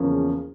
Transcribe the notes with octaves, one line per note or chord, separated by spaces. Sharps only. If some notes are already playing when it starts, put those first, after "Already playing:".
Already playing: E2 C#3 F3 A#3 C#4